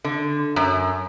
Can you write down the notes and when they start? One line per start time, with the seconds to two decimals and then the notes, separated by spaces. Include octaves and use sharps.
0.05 D3
0.56 F#2